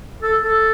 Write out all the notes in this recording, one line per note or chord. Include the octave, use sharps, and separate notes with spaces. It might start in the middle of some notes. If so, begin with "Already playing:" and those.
A4
A4